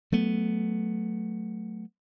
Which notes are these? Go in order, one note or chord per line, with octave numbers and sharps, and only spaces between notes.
F#3 A3 B3